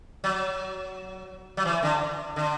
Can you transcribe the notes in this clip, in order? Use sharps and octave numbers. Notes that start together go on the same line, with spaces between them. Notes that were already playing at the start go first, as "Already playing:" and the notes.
F#3
F#3
E3
D3
D3